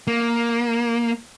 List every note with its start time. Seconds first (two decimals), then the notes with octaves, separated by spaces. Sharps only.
0.07 A#3